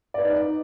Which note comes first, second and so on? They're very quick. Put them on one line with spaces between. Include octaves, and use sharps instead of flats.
D5 B4 D#4